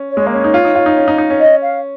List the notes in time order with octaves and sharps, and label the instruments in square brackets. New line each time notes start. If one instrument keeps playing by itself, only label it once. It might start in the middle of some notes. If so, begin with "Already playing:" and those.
Already playing: [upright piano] C#4
[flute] C#5
[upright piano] G#3
A#3
[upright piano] C#4 [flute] C#5
[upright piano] D#4
F4
D#4
F4
D#4
C#4
D#4
D#4
C#4
[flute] D#5
F5